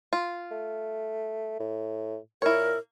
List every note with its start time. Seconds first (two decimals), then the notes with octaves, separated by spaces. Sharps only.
0.13 F4
0.51 A3
1.60 A2
2.42 A#2 E4 A#4 C#5